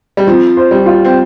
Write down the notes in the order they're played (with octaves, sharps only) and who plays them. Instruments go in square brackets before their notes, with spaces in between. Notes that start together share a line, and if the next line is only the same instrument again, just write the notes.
[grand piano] G3
[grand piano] F3 [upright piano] C4
[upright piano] C5
[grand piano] G3
[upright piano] F4
[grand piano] C4